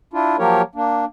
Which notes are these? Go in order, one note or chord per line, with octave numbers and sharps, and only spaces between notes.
D4 E4 F4
F3 F#3 A#3 G4 A#4 C#5
A#3 D4